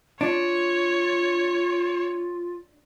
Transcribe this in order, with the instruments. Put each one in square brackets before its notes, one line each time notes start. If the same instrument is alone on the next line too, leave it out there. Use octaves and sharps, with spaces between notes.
[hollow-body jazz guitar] D4 [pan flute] F4 [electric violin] C#5